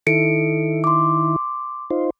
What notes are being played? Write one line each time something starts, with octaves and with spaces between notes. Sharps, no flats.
D#3 E4 A4 C#7 D7
C6 D6
D#4 F4 C5